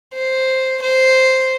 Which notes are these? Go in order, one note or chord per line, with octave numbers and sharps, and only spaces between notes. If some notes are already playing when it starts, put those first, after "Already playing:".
C5
C5